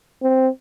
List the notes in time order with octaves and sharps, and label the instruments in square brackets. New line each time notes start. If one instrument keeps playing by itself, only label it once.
[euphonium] C4